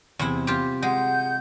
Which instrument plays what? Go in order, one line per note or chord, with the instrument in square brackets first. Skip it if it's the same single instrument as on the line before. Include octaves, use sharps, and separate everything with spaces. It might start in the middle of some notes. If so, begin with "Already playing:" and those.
[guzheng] E2 C3 E4
F4 G4
[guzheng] G#3 [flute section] F#5 G6